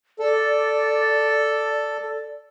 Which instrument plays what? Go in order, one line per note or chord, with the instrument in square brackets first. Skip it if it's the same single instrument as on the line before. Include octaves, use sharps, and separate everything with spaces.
[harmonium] A4 [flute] D5